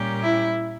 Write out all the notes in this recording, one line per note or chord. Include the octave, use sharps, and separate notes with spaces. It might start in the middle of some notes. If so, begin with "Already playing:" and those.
Already playing: A#2 G3 C#4 G4 A#4
E4